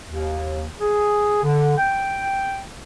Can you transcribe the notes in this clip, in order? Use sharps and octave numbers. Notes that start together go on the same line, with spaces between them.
D#2
G#4
D3
G5